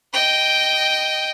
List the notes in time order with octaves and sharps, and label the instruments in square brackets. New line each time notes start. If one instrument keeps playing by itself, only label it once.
[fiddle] D#5 G5